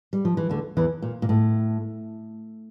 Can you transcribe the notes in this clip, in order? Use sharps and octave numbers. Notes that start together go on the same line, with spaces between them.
G3
F3
E3
D2 D3
E2 E3
A#2
A#2
A2